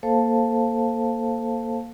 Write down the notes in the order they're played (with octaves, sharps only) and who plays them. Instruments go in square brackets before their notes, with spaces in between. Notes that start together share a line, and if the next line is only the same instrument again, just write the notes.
[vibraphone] A#3 A4 C5 F5 A5